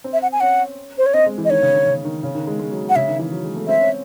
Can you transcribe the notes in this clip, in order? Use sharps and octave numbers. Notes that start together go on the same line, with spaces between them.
C4
E5
F#5
G#5
C#4 F#5
C5
C#5
C4 D#5
G#3
E3
D#5
D#3 C#5
C#3
D#3
C#3
D#3
C#3
D#3
G#3
G#3
F#3
F#5
C#3 E5
D#3
E3
F#3
G#3
A3
C4 E5
C#4